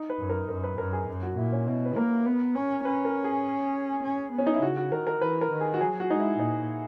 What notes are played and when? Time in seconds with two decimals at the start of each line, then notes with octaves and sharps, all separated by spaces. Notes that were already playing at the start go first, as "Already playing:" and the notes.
Already playing: D#4
0.10 B4
0.19 F#2
0.30 A#4
0.49 F#2 A#4
0.64 B4
0.78 F#2 A#4
0.93 G#4
1.08 F#2
1.23 F#4
1.37 A#2 E4
1.52 C#4
1.67 B2 E4
1.85 B4
1.96 A#3 A#4
2.26 B3
2.56 C#4
2.85 C#4 B4
3.05 A#4
3.24 G#4
4.03 C#4
4.32 B3
4.38 C#4
4.47 D#4
4.54 E4
4.62 C#3 F#4
4.77 F#4
4.92 D#3 A#4
5.07 A#4
5.21 E3 B4
5.41 A#4
5.51 D#3
5.61 G#4
5.74 F#4
5.81 F#3 G#4
6.00 F#4
6.10 G#3 D#4
6.20 E4
6.39 A#2 D#4